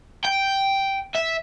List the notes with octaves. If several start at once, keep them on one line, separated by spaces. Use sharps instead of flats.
G5
E5